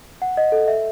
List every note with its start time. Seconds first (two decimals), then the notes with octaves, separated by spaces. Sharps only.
0.22 F#5
0.37 D#5
0.52 A4
0.68 E5